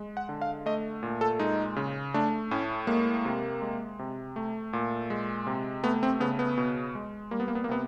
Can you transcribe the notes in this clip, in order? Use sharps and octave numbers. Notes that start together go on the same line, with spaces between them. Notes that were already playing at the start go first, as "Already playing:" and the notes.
Already playing: G#3
F#5
D3
F5
A3 D#5
A#2
A4
G#3 D#4
C#3
A3 D4
A2 C#4
G#3 A#3
C3
G#3
C3
A3
A#2
G#3
C3
A3 B3
C4
C#3 B3
B3
B2
G#3
G3 A#3
B3
A#3
B3
A#3
C3 B3